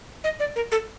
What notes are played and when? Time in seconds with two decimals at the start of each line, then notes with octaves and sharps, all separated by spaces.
0.24 D#5
0.40 D5
0.56 A#4
0.72 A4